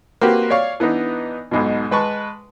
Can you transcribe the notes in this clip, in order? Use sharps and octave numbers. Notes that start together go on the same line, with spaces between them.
A#3 C4 F#4 G4 B4
C#5 D5 F5 C#6
E3 B3 D4 D#4
B1 G#2 B2
G#3 B4 A5 C#6